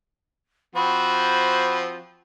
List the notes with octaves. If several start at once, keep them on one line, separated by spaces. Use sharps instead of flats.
F3 C4 F#4 B5